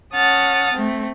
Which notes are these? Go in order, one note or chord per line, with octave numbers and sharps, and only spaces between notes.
C#4 F#5 A5 D#6 F6 A6
A3 C4